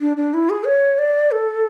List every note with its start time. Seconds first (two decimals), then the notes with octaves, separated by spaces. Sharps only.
0.01 D4
0.17 D4
0.34 E4
0.50 G#4
0.66 C#5
0.99 D5
1.31 A4